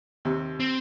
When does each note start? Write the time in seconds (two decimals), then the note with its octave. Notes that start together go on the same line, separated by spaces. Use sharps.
0.25 D#2 C3
0.60 C4